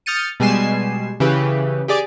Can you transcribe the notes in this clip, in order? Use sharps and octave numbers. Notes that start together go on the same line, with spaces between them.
D#6 F6 G6 A6 C#7 D#7
B2 G3 G#3 G#5 C7 E7
C#3 E3 G4 B4
G4 G#4 D5 D6